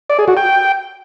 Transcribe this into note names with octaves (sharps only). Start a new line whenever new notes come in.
D5
G#4
F#4
G5